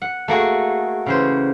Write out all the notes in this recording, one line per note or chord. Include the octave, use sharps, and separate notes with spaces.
F#5
A3 A#3 F#4 G#4
C#3 E3 C5